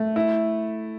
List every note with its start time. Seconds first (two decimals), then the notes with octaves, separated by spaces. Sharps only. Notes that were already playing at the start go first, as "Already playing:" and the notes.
Already playing: A3
0.16 E4